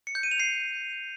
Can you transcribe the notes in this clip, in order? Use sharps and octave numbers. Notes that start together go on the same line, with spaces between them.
C#7
G6
D#7
F7
C7